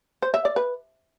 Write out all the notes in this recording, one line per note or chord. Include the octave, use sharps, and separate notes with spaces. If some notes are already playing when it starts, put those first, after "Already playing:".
C5
E5
D5
B4